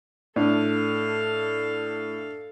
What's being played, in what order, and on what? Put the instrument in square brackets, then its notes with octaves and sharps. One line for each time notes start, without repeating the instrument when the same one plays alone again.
[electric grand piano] A2 [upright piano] D4 [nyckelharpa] A4 F5